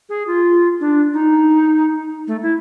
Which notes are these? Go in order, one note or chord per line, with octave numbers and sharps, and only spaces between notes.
G#4
F4
D4
D#4
A3
E4